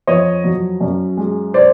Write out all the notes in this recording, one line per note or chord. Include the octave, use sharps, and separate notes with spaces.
F2 C#5 D#5
F#3
F#2
G#3
C5 D5